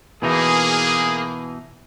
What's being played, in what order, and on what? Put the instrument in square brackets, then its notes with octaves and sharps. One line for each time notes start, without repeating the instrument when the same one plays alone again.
[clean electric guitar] B2 E3 D#4 [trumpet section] A#3 G#4